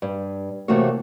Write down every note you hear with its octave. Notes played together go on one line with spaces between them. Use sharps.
G2
C3 E3 A3 A#3 F#4 C#5